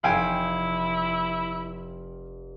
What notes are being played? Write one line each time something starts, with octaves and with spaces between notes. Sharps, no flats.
F1 E4 F5 G5 G#5